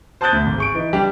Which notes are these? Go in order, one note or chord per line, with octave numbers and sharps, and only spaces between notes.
C5 A5 D#6 F#6 G6 A6
D2
G#1
G#4 C#6 D7
E3 D#4
G3 D4 G4